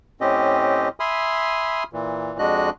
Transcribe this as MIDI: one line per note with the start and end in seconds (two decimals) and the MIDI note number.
0.21 0.89 45
0.21 0.89 60
0.21 0.89 61
0.21 0.89 67
0.21 0.89 75
1.00 1.84 76
1.00 1.84 80
1.00 1.84 83
1.00 1.84 84
1.00 1.84 87
1.00 1.84 89
1.93 2.38 46
1.93 2.38 52
2.39 2.70 41
2.39 2.70 56
2.39 2.70 62
2.39 2.70 66
2.39 2.70 75
2.39 2.70 90